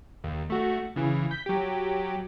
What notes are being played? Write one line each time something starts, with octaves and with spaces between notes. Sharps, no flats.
D#2
A3 F#4
C#3 E3
G6 B6
F#3 G4